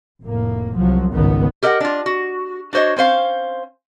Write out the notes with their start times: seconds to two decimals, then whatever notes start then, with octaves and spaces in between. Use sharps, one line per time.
0.23 F1 A2 A#3
0.75 C2 F3 F#3
1.13 G#1 C#2 G2 D#3 B3
1.63 G4 A#4 D#5 E5 F#5
1.80 D4 F4
2.06 F#4
2.73 D4 F#4 C5 C#5 D#5
2.96 C4 C#4 C5 F5